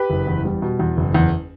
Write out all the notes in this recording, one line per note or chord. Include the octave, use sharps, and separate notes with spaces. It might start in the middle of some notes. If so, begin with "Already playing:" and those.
Already playing: G4 B4
F#1
E2
G3
B2
E2
F#1
E2